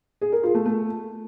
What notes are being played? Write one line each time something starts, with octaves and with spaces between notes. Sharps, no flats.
G#4
A#4
F4
A3
A3